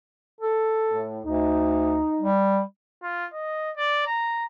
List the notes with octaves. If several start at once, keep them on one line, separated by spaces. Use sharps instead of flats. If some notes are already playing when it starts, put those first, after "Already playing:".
A4
A2
D2 D#4
G3
F4
D#5
D5
A#5